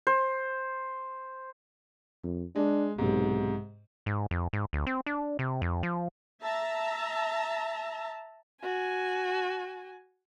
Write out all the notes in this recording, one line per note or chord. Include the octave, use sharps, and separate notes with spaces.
C5
F2
G#3 D4
B1 G#2 C3
G#2
F2
G#2
D2
C4
D4
C3
F2
F3
E5 A5 A#5
F#4 G#5